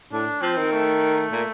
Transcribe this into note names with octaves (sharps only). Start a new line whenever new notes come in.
A2 D4
F3 C4
D#3
A3
A#2